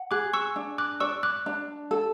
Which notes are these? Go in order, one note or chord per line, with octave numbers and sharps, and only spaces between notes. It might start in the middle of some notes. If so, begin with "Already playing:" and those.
Already playing: F#5
G#4 D6 F#6
C#6 E6
D4
D6 F#6
D5 C#6 E6
D6 F#6
D4
A4